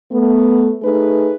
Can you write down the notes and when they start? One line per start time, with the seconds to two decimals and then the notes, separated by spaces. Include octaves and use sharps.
0.12 A3 B3
0.83 A3 D#4 G#4 B4